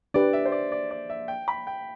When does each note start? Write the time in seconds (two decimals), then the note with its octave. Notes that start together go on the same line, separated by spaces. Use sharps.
0.14 D4 G4 B4 D5
0.33 E5
0.45 C5
0.52 D5
0.72 D5
0.91 D5
1.10 E5
1.28 G5
1.48 B5
1.67 G5